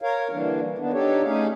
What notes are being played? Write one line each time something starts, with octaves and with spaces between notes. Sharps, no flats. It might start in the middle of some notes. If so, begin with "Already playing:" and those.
A#4 C#5 F5
D3 E3 G3 A#3 D4
D#3 B3 D4
D4 D#4 G4 A4 C#5
A3 C#4 D#4 G#4 F5